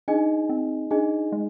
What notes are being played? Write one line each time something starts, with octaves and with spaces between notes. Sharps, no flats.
D4 D#4 G#4 D#5 G#5
C4
D4 D#4 G#4 D#5 G#5
G#3